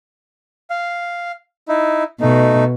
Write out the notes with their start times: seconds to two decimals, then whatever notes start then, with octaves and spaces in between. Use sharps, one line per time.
0.70 F5
1.68 D#4 E4
2.21 B2 A3 D#4